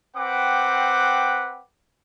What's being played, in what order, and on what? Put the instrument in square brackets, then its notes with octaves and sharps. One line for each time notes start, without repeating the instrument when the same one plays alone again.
[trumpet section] C4 B4 F#5 G5 D6